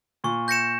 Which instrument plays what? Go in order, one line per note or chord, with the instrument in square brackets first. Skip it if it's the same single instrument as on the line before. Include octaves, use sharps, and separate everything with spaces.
[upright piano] A#2 [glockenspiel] C#6
[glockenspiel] G6 A#6 C#7 E7